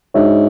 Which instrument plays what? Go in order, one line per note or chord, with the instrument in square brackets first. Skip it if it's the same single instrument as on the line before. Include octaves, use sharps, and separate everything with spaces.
[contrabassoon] G#2 [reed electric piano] G#3 D4 F#4 C#5 E5